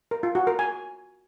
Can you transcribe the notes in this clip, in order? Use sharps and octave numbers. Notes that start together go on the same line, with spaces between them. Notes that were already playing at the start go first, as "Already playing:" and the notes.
A#4
F4
F#4
A#4
G#5